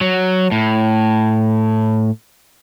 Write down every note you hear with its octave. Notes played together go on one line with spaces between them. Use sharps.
F#3
A2